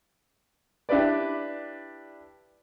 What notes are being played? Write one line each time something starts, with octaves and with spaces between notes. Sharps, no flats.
D4 E4 G4 B4 D5